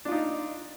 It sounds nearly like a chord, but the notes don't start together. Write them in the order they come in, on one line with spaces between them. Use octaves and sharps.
D4 F4 D#4